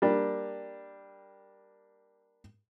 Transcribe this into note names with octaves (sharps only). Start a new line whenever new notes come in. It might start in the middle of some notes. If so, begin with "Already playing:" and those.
G3 A#3 D4 G4